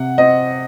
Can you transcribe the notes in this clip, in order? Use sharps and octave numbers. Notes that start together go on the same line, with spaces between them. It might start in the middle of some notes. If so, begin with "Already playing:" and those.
Already playing: C3 F#5
C4 D#5